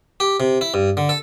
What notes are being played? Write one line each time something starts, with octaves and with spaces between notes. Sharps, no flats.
G4
C3
E4
G2
D3
A4